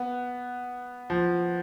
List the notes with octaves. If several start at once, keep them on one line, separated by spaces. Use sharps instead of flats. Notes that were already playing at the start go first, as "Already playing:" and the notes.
Already playing: B3
F3